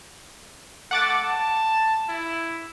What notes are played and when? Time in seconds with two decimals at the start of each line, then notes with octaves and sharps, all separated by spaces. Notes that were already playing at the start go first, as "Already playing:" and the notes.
0.91 A3 F#5 D6 A6
1.24 A5
2.09 E4